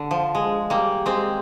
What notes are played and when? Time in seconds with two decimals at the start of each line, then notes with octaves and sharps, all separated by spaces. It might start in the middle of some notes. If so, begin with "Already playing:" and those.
Already playing: D3
0.11 F3
0.35 G#3
0.70 G3 A#3
1.06 G#3 C4